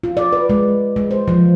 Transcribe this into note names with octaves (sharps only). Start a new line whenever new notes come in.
F4
D5
B4
G#3
G#3
C5
F3